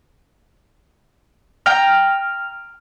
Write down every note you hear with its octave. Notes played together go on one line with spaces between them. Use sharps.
G5 A#5 F6